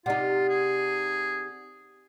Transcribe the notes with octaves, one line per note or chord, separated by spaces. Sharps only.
C3 D#4 F4 G4 D5 F#5
G#4